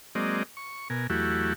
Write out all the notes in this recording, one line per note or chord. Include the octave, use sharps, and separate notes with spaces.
F#3 G#3 A#3 C4 D5 D#5
C#6
B2 A#4 G#5
E2 F#3 A3 E4 F#4 G4